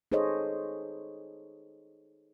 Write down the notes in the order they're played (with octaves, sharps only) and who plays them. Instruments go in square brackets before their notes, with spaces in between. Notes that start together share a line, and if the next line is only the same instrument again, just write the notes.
[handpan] D#4 G#4 A4 C5 C#5 D#5